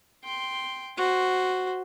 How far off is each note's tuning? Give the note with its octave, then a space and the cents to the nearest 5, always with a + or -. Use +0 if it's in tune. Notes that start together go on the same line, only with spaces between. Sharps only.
G5 +0 C6 +0
F#4 +0 C5 +0